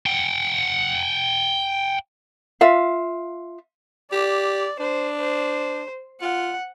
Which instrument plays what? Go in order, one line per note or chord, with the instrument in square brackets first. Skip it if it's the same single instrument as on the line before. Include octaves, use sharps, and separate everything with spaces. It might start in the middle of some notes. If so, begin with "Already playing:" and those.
[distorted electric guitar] F#5 G5
[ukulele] F4 E5 F5
[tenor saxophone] G4 [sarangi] D5
[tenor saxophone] D4 [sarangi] C5
[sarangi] C5
[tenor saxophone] F4 [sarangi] F#5